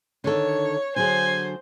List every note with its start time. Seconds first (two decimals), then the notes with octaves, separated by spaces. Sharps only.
0.24 D3 D#3 A4 C#5
0.96 D3 F#3 G#4 C5 G#5